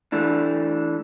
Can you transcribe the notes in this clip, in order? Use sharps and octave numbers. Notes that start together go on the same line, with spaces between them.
E3 A3 D4